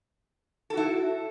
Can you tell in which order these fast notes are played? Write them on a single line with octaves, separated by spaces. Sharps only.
A4 F#4 E4